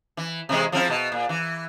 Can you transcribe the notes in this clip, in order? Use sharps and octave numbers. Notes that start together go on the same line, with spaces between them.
E3
C3 E3 G#3
F3 C4 E4
B2
A#2
E3